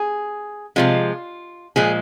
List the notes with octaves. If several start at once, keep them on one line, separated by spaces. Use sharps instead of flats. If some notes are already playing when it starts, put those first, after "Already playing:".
Already playing: G#4
C3 F3 G#3 F4
A#2 F3 G#3 G#4